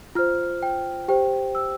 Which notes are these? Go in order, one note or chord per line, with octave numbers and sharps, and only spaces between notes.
F4 C5 F6
G5
G4 C5 G5
E6